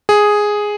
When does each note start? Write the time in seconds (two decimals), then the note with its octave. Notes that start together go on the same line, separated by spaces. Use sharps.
0.09 G#4